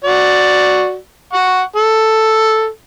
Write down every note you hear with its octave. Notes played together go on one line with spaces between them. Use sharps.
F#4 D5
F#5 C#6
A4